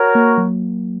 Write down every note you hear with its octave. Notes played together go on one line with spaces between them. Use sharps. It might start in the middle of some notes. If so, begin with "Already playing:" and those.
Already playing: F#4 A#4 C#5
A#3
F#3